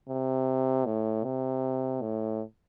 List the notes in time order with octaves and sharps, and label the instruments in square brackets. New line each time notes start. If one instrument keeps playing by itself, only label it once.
[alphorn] C3
A2
C3
A2